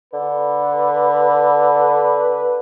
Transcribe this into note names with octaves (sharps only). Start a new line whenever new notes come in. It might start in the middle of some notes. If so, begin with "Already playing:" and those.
D3 B4